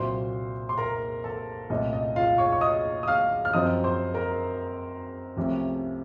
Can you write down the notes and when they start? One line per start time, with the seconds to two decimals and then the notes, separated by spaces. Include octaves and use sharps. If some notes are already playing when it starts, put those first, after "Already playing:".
Already playing: C2 A#2 F#3 C5 C6
0.69 C6
0.78 A#4 A#5
1.24 A4 A5
1.70 C2 A#2 A3 C#4 D#5
1.93 D#5
2.16 F4 F5
2.38 C#5 C#6
2.52 C#6
2.61 D#5 D#6
3.03 D#6
3.08 F5 F6
3.45 F6
3.53 F#2 F3 C4 D#5 D#6
3.84 C5 C6
4.14 A#4 A#5
5.37 C2 C3 F3 A3 C#4